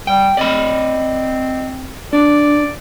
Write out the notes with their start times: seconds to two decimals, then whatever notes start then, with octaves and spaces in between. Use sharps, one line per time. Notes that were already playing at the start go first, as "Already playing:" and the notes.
0.07 G3 G5
0.37 C4 D5 D#5 B5
2.13 D4 D5